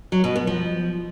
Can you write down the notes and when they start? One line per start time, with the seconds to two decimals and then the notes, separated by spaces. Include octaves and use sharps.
0.12 F#3
0.24 B2
0.36 B3
0.47 F3